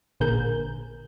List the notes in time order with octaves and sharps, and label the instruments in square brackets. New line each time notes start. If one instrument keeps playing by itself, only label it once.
[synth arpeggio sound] A1 A#2 D3 G#4 A#4 G6